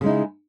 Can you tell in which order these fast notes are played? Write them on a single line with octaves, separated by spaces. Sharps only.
C#3 G#3 D#4 E4